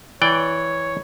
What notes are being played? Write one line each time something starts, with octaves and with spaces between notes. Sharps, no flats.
E3 C#5 D5 G5